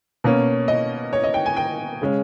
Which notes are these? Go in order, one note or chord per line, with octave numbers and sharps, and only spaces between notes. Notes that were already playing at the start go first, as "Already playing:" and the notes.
B2 A#3 C#4
D#5
C#5
D#5
G5
G#5
G5
C#3 G#3 C#4